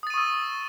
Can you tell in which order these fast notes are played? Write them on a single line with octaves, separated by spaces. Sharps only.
D#6 A6 D#7 C#6 E6